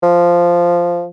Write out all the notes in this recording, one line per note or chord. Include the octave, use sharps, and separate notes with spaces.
F3